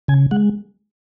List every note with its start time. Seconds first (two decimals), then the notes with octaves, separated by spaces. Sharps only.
0.08 C#3 G#5
0.31 G#3 F#5